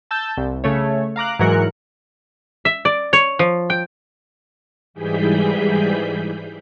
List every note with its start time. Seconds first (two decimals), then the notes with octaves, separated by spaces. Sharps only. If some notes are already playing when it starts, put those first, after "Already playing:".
0.11 A5 E6 G6 A6
0.37 C2
0.64 C#3 A3 C#5
1.16 F5 A#5 D6 F#6
1.39 G#2 E3 F#3 A#4 F#6 C#7
2.65 E5
2.85 D5
3.13 C#5
3.39 F3
3.70 G5
4.94 G#2 E3 G3 G#4 G6 B6